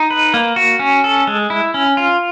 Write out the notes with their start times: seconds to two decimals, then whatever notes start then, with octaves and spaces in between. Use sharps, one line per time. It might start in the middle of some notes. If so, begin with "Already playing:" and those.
Already playing: D#4
0.10 B4
0.34 A#3
0.56 F#4
0.79 C#4
1.04 A4
1.27 G#3
1.50 E4
1.74 C#4
1.97 F4